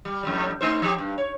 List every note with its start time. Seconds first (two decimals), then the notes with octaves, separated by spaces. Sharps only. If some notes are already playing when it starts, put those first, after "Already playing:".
0.05 G3
0.23 F2 A2 G3
0.61 A3 D#4 C5
0.82 F3 G4
0.98 G2
1.18 C#5